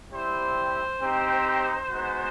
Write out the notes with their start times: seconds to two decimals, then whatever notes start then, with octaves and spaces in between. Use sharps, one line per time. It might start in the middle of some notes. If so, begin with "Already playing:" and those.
0.10 G3 C4 E4 G4 C5
1.01 C4 D#4 G4
1.90 G#3 B3 D#4 F#4